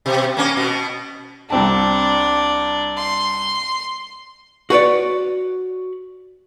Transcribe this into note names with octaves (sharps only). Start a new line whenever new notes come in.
B2
A#3 C#4
B2
C2 C4 D4 A5
C6
F#4 B4 C#5 D5